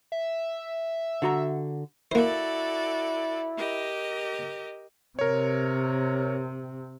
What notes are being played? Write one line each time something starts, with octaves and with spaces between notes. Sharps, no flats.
E5
D3 F#4 A#5
A#3 E4 F#4 A4 C5 D5
G4 A#4 D#5
C3 A#4 C#5